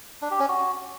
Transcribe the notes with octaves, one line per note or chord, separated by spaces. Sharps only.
D4
G4
C#4
F#4